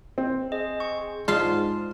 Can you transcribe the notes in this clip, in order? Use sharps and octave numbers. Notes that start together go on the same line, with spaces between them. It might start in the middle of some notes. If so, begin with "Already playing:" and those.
C4
G#4 D#5
C#6
G#2 G#3 F4 F5 A5